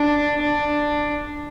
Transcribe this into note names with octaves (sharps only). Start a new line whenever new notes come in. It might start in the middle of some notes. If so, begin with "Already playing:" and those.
Already playing: D4
D4